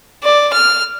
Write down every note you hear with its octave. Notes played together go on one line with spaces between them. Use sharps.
D5
F6